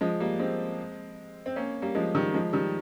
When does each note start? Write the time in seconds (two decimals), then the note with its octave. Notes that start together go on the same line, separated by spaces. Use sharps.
0.01 F3 G#3
0.20 G3 A#3
0.40 G#3 C4
1.46 C4
1.56 A#3 C#4
1.82 G3 A#3
1.95 F3 G#3
2.15 D#3 G3
2.34 F3 G#3
2.53 D#3 G3